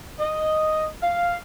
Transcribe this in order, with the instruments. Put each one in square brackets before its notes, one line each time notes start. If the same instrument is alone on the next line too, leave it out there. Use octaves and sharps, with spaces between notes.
[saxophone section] D#5
F5